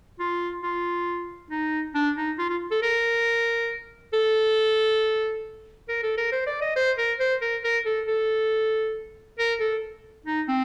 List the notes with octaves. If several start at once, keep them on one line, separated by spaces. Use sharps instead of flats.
F4
F4
D#4
D4
D#4
F4
F4
A4
A#4
A4
A#4
A4
A#4
C5
D5
D#5
C5
A#4
C5
A#4
A#4
A4
A4
A#4
A4
D#4
C4